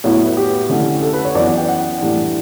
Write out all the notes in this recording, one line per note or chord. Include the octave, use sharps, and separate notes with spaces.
A2 F#3 B3 E4 C#5
B4
G4
D3 A3 C#4 E4
A4
B4
C#5
F#2 E3 B3 D5
F#5
G5
F#5
A2 E3 G3 D4